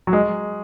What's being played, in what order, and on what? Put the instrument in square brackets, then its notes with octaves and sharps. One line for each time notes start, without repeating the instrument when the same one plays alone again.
[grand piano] F#3
G#3